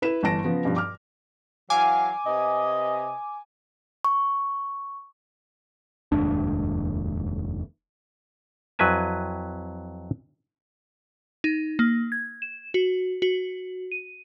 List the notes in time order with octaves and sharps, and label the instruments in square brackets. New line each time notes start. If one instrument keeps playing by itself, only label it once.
[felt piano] E4 B4 E7
G1 E3 A5 A#6 D7
C#3 F3 B3
G2 B2 F3
D6 F6
[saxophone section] E3 F#3 F5 [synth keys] G#5 D6
[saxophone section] C3 B4 D#5
[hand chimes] C#6
[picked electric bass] F1 D#2 G#2 D4
[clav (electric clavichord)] F2 F#3 E4 B4 G#5 A5
[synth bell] D#4
A#3
G#6
E7
F#4
F#4
D#7